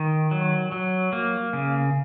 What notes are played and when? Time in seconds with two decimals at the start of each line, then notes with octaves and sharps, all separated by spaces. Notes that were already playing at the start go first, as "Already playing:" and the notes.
Already playing: D#3
0.31 F#3
0.72 F#3
1.13 A#3
1.53 C#3